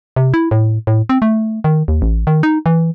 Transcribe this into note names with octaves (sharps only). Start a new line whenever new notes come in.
C3
E4
A2
A2
C4
A3
D#3
D#2
A1
D#3
D#4
E3